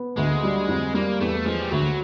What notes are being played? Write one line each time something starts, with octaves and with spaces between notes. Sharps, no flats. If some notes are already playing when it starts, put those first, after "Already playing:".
Already playing: B3
D2 G#3
G3
F2
G3 A#3
E2 A3
F3 G#3
G3
D2 F#3